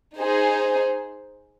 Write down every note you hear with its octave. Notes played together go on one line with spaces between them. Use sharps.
D#4 G#4 C5